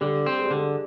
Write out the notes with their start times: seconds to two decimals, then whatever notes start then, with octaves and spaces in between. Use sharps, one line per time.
0.01 D3 G3
0.26 C4
0.38 G#3
0.46 G3
0.51 D3 G#3